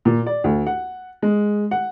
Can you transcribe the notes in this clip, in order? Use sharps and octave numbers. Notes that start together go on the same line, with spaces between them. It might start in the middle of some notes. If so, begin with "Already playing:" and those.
A#2
D5
D2
F#5
G#3
F#5